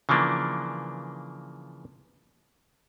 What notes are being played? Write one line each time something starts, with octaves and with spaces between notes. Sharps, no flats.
C#3 E3 F3 A#3 D4